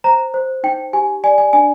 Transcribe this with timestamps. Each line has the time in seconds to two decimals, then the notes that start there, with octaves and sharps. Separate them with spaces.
0.04 C5 A#5
0.34 C5
0.63 D#4 G5
0.93 G4 G#5
1.24 D5 G#5
1.38 G#5
1.53 D4 G#5